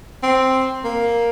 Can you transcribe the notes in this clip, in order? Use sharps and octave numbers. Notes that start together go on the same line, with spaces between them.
C4
A#3